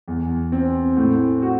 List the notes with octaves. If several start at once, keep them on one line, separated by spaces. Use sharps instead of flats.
E2
C4
A2
F#4